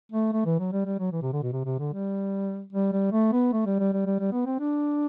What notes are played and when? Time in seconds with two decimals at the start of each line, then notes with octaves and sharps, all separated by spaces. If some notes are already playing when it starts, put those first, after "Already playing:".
0.12 A3
0.33 A3
0.46 E3
0.59 F#3
0.73 G3
0.86 G3
0.99 F#3
1.12 E3
1.22 C3
1.33 D3
1.42 B2
1.53 C3
1.65 C3
1.79 D3
1.93 G3
2.73 G3
2.93 G3
3.12 A3
3.33 B3
3.53 A3
3.66 G3
3.79 G3
3.93 G3
4.06 G3
4.19 G3
4.33 B3
4.46 C4
4.59 D4